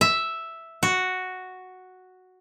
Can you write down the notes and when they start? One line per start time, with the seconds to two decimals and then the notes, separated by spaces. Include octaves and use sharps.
0.01 E5
0.83 F#4